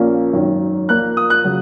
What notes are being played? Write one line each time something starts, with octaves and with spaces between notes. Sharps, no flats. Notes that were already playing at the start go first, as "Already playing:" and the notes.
Already playing: A#1 A#2 A#3 C#4
G#1 F#2 D#3
A#1 A#2 A#3 F#6
D#6
F#6
C#3 F#3